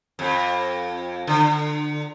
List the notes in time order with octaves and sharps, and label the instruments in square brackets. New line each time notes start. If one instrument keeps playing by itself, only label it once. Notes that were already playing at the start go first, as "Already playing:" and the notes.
[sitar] F2
D3